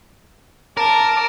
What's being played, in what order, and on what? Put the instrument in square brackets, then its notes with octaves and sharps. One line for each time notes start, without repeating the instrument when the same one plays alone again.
[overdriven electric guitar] A#4 [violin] A5 D6